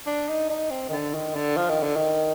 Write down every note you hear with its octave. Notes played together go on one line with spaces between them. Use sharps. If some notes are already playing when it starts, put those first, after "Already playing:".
D4
D#4
D#4
C4
D#3
D3
D#3
D3
F3
D#3
D3
D#3